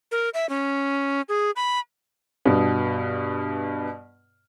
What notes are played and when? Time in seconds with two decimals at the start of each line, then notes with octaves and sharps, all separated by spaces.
0.12 A#4
0.34 E5
0.49 C#4
1.29 G#4
1.56 B5
2.46 G2 B2